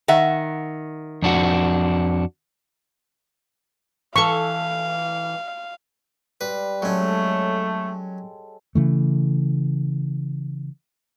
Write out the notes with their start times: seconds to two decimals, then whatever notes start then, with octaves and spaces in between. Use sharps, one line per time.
0.08 D#3 E5 F#5
1.22 F2 D4 F#4
4.16 E3 A4 F5 C#6
6.41 G3 B4 C6
6.82 F#3 G#3 A3 C#4 A4 C#5
8.75 C#3 E3 A3